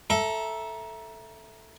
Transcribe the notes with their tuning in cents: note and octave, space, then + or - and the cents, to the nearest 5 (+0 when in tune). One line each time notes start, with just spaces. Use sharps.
A4 +0 E5 +0 A#5 +20